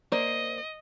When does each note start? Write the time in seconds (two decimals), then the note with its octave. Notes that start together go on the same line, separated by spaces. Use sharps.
0.12 A#3 C5 D5 D#5